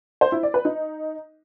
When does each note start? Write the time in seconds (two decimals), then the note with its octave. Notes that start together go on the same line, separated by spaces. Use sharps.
0.21 C5
0.32 E4
0.43 D5
0.54 B4
0.65 D#4